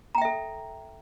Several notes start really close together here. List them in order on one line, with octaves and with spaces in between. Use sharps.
A#5 G5 E5 A4